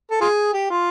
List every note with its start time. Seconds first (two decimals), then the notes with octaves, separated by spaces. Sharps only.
0.11 A4
0.21 F4 G#4
0.54 G4
0.70 F4